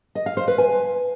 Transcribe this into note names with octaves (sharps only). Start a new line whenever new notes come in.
D#5
F5
C5
B4
G#5